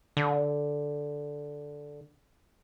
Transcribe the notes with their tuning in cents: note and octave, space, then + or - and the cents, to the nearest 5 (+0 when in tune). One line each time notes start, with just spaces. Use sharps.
D3 -5